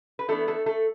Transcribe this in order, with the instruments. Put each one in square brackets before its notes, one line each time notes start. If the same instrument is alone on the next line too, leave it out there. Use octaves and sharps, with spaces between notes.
[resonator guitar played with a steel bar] B4
E3 A3 B3 D4 A4
A3 A4
A3 A4